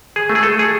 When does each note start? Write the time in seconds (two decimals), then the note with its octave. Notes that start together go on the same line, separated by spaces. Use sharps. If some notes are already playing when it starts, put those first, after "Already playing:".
0.16 G#4
0.29 A3
0.35 G#4
0.43 A4
0.59 G#4